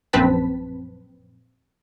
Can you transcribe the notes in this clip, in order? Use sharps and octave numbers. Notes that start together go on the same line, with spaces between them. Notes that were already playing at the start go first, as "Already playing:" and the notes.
A#1 F#2 C4 B4 A5 B6